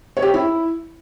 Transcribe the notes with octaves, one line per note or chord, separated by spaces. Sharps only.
C#5
G4
C#5
E4